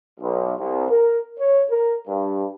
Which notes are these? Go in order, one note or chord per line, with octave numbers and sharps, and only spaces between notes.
B1
C2
A#4
C#5
A#4
G2